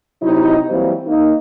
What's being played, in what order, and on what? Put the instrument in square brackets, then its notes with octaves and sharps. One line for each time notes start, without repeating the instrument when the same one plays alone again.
[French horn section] C3 F#3 D#4 E4 D#5
E3 F#3 G3 A#3 C4
A#3 D#4